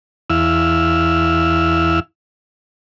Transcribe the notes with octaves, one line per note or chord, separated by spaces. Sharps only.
E2 E4 F5 E6